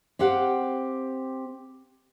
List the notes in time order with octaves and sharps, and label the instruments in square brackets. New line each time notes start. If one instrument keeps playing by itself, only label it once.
[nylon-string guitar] C4 G4 F5 F#5